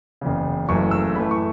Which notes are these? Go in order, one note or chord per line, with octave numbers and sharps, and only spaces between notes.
F#1 E2 C#3
F#1 F#2 E3 A3 C#6
E6
A1 A2 E3 A3 B5
C#6